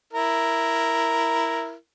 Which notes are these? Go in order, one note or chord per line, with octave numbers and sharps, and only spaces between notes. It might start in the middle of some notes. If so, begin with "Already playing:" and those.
E4 A#4